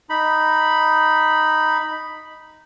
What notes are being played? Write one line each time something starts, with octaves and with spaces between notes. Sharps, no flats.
D#4 B5